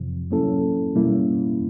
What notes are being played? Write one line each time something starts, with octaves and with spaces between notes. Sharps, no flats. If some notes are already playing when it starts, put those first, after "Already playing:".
Already playing: F2 C3 F3
F#3 A#3 C#4 E4 A4
B2 G3 A#3 C#4 E4